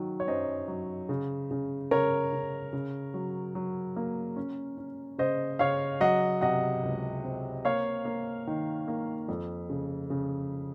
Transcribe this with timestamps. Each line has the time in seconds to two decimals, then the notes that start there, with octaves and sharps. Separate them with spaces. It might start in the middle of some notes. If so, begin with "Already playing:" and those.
Already playing: D#3 F#3
0.20 C#5
0.28 F#2 C5 D#5
0.68 F#3
1.09 C#3
1.51 C#3
1.91 C#3 A#4 C#5
2.33 C#3
2.73 C#3
3.14 F#3
3.55 F#3
3.96 A#3
4.36 C#4
4.77 C#4
5.18 C#3 C5 D#5
5.59 C#3 C#5 F5
6.00 F#3 D#5 F#5
6.41 C3 D#5 F#5
6.83 C#2
7.24 C4
7.65 A#3 C#5 F5
8.05 A#3
8.47 D#3
8.88 A#3
9.28 F2
9.70 C#3
10.10 C#3